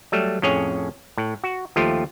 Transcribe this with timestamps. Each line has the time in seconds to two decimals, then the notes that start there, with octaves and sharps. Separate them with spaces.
0.12 F#3 G3 A3
0.42 F2 A2 C#4 G#4 C#5
1.18 A2
1.44 F#4
1.76 D#2 F3 A3 F4 G4